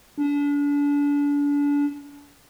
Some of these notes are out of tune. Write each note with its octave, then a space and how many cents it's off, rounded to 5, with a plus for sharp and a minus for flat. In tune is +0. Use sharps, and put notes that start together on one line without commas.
D4 -35